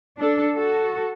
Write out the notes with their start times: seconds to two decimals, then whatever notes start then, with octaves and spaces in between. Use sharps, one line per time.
0.19 D4 A4
0.56 F#4 A4